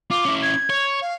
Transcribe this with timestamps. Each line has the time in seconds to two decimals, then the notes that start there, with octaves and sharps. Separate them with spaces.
0.11 F4 D6
0.25 C#4 E4
0.42 G#6
0.70 C#5
1.02 F5